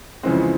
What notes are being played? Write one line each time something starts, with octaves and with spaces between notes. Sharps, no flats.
F2 C#3 E3 G#3 C4
C#4